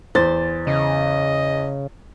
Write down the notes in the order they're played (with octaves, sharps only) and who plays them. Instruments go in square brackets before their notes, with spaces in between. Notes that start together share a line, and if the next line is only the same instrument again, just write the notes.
[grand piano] E2 A6 [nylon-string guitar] C5
[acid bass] C#3 [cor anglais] D#5